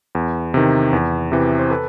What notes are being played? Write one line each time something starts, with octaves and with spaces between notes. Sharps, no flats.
E2
C3 D#3
E2
C3 E3
C5
A4 B4